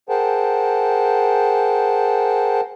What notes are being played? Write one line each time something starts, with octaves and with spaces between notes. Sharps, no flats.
G#4 A#4 C5 F#5 G5 A5